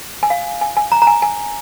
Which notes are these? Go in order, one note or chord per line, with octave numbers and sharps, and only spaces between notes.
G#5
F5
G#5
G#5
A#5
A#5
G#5
G#5